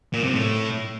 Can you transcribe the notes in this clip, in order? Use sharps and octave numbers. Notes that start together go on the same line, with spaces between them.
A#2
C3
A2